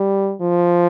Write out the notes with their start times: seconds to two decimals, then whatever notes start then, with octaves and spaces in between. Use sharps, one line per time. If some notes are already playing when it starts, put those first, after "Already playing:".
Already playing: G3
0.41 F3